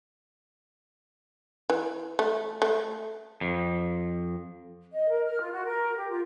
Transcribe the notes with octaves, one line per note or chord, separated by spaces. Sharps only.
E3
A3
A3
F2
D#5
A#4
F6
F4
F#4
A#4
G4
F4